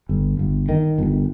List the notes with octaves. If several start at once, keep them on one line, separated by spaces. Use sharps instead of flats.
G1
G1
D#3
G1